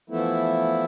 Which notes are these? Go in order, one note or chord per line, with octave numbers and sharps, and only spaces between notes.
E3 F3 A3 B3 E4